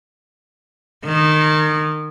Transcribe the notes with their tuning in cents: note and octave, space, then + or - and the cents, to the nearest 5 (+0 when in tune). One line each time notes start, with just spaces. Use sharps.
D#3 -20